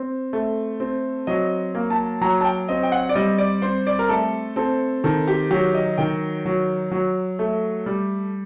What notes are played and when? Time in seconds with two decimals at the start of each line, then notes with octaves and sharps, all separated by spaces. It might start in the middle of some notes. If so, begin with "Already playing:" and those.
Already playing: C4
0.33 A3
0.80 C4
1.27 F#3 D#5
1.75 A#3
1.90 A5
2.21 F#3 A#5
2.41 A5
2.45 G5
2.69 C4 D#5
2.83 G5
2.92 F#5
3.09 D5
3.15 G3 D#5
3.38 D5
3.62 C4 C5
3.87 D5
3.99 A#4
4.09 A3 A4
4.56 C4 A4
5.04 D#3 A4
5.28 G4
5.51 F#3 G4
5.74 D#5
5.98 D#3 G5
6.45 F#3
6.92 F#3
7.39 A3
7.86 G3